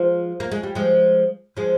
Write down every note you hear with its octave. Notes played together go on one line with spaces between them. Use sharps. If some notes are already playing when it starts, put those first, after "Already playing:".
Already playing: F3 G#3
A#3
G#3
G3
F3 G#3
F3 G#3